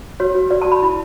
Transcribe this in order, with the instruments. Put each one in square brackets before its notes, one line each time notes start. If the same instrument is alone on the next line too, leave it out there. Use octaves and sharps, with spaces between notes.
[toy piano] F#4 C#5
F#4
F#4 D5
A5
F#4
B5
E4